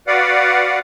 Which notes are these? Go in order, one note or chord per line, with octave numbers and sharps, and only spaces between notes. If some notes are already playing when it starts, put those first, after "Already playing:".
F#4 B4 D5 F5 F#5